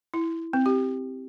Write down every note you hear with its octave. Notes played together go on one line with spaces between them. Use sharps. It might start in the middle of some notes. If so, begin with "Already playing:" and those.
E4
C4
G4